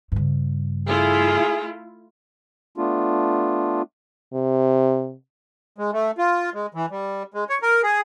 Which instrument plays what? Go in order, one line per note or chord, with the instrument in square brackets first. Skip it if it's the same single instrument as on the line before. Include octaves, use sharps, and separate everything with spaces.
[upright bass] G2 C#3
[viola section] A3 E4 F4 [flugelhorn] G#4
[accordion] A3 B3 D4 F4
[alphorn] C3
[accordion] G#3
A3
F4
G#3
E3
G3
G#3
C#5
A#4
G#4